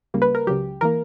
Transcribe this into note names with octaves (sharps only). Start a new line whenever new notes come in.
C#2 C#3 G3 A#3
B4
A#4
C#2 C#3 F#3 G4
E3 A#3 A#4